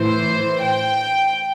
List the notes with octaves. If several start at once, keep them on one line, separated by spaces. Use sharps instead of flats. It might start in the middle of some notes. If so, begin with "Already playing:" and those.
Already playing: A2 E3 C5
G5